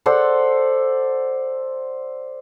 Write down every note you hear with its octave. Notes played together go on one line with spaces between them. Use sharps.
A4 C5 D5 F#5